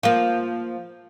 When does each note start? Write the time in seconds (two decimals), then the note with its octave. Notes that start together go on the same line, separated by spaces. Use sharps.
0.03 F3 A#3